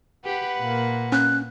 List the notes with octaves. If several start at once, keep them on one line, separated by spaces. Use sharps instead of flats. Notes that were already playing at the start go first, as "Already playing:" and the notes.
G4 B4 F#5
A#2 A#3
C#4 F#6